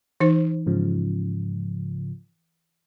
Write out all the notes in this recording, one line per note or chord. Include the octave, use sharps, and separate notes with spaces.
E3 D#4 C5
G#2 C#3 F3